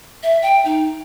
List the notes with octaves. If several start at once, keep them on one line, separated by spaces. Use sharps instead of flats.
E5
G5
D#4